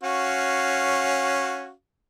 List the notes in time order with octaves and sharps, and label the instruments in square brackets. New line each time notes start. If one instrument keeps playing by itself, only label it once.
[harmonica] C#4 F#4 F5